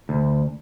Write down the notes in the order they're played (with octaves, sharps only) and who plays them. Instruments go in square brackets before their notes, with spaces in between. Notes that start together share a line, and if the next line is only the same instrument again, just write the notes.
[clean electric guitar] D2